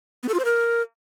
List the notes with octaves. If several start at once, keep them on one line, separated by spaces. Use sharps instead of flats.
B3
A4
F4
C5
A#4